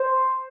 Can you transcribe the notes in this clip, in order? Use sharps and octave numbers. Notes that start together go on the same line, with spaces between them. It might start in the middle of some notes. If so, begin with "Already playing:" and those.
Already playing: C5